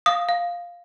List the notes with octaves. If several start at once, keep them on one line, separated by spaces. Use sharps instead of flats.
F5 D#6
F5